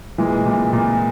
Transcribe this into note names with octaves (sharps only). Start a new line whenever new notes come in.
A#2 E3 G#3
A#2
A#2